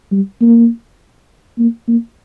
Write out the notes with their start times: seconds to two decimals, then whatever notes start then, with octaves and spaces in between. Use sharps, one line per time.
0.12 G3
0.41 A#3
1.59 A#3
1.88 A#3